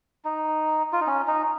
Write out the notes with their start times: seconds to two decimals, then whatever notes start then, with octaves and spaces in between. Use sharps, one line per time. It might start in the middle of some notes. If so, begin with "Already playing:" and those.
0.25 D#4
0.93 F4
1.01 D#4
1.07 C#4
1.28 D#4